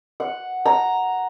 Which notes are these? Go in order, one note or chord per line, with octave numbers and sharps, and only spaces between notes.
F#5
A#5